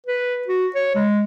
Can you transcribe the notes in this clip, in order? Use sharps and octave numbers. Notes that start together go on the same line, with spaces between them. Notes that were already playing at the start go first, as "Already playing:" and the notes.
B4
F#4
C#5
G#3